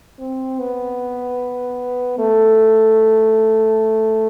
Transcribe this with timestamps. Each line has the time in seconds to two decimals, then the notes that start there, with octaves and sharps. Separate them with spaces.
0.19 C4
0.59 B3
2.18 A3